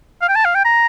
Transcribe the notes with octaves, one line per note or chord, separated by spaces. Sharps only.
F5
G5
A5
F5
G5
A#5